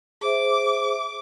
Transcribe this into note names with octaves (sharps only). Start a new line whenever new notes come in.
G#4 C5 E5 D6